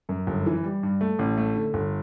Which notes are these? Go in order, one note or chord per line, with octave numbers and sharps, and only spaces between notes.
F#2
G1
E3
G3
G2
A3
A1
A3
D3
G1